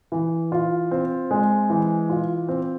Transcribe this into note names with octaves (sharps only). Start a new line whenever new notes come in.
E3
F4
C4
G#3
E3
F4
C4